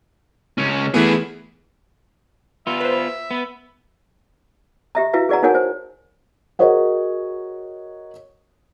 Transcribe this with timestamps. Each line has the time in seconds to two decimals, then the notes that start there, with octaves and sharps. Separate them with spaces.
0.58 C#2 C#4
0.94 E3 A3 B3 E4 G#4
2.67 B3 F4 E5
2.80 B4 C5
3.31 B3
4.95 G4 E5 A#5
5.13 E4 F#4 B4 F5 A#5
5.29 G#4 B4 D5 F#5 A#5
5.43 D#4 F#4 A#4 C#5 F#5 G#5
5.55 C5
6.59 F#4 G#4 A#4 C#5 D#5 F#5